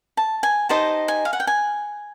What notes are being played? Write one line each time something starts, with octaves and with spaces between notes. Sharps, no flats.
A5
G#5
D#4 G4 C5 D#5 A5
G#5
F5
F#5
G5
G#5